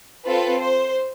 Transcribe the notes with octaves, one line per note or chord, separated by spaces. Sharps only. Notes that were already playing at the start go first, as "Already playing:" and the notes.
C4 F4 A4 B4
C5